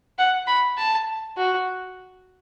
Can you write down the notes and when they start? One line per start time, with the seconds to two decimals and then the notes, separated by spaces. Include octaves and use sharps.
0.18 F#5
0.47 B5
0.78 A5
1.38 F#4